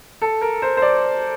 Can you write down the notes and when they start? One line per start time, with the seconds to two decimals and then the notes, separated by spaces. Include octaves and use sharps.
0.22 A4
0.41 A#4
0.62 C5
0.77 C5
0.82 D5